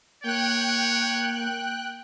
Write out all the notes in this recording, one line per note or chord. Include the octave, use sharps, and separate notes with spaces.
A#3 C#5 G5 F#6